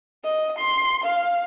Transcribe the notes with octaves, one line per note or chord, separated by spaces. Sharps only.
D#5
C6
F5